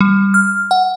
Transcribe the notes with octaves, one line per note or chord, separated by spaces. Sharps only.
G3
F6
F#5